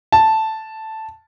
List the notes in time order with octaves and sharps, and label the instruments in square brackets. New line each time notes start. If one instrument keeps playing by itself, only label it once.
[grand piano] A5